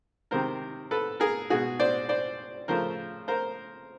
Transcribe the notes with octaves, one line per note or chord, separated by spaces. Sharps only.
C3 D#3 G#3 A#4 C5
A4 B4
G#4 A#4
B2 G#3 F#4 G#4
C5 D5
C5 D5
C#3 F3 A3 A#4 C5
A#4 C5